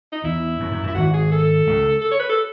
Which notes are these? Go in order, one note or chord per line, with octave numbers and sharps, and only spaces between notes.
D#4
E2 E4
F#2
F#2
F#2 E4
G#1 G#2 F#4
G#4
A4
C#2 C#3
A4
C#5
B4
A4